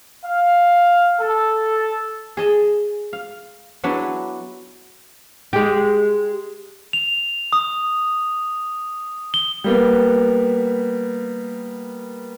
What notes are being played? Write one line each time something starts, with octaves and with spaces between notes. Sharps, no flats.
F5
A4
G#4 D#5 A5
F5
F#3 B3 D4 E4 B4
G#3 G4
F7
D#6
G7
G3 A#3 B3